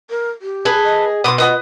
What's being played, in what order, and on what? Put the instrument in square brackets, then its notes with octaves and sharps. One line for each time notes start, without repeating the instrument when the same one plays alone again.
[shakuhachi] A#4
G4
[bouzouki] G#4 [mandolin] A4 B4
[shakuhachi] D#5
[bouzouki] B2 [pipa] B3 C6 [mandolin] D6 D#6
[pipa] B3 D#5 [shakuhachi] F4 [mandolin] B4 D#6